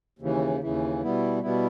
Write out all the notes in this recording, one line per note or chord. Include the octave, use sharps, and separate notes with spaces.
D#2 C#3 E3
D#2 C#3 E3
B2 G3 B3 E4
B2 G3 B3 E4